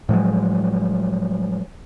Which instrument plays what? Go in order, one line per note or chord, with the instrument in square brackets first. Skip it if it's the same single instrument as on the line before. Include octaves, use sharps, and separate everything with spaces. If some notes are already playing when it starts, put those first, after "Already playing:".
[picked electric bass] A2 F3 F#3 G#3